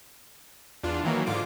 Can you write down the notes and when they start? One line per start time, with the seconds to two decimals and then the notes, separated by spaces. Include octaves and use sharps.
0.83 E2 D4 F4
1.04 D#3 E3 F#3 A#3
1.26 G#2 D3 F4 D6